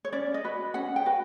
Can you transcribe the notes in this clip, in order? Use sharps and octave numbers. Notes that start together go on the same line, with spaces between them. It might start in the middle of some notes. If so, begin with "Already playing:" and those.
C#5
C#4 D5
D#5
F#4 B4
C#4 F#5
G5
F#4 B4